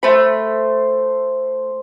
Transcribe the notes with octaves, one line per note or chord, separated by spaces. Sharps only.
A3 C5 B5